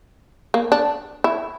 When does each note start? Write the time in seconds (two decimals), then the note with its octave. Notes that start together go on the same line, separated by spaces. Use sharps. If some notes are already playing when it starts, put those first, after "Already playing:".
0.54 A#3
0.72 D4
1.24 E4